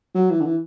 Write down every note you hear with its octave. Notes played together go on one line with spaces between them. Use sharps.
F#3
E3
D3
E3